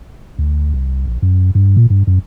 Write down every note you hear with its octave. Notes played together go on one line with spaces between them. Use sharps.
D2
C2
A#1
F#2
G2
A#2
G2
F#2